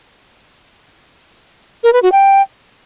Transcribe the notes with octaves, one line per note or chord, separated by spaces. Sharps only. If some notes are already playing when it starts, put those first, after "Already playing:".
A#4
B4
F#4
G5